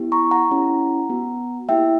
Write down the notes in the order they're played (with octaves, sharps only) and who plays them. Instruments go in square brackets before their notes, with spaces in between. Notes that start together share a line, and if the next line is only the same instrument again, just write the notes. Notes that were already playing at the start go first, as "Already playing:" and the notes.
Already playing: [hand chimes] B3 E4 G4
A#5 C#6
F#5 A#5
C#4 E4 G4
B3 F#4
A#3 E4 G4 E5 G5